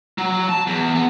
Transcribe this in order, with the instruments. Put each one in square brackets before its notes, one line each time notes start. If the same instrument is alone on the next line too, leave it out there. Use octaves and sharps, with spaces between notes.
[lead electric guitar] F#3
A5
E2
B3